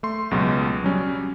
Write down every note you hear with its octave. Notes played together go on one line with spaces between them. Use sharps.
A3 C6
C#2 B2 F#3 G#3
F#3 G3 C#4